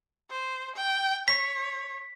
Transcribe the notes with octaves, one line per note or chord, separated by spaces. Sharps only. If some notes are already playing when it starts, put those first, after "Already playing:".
C5
G5
C#5 B6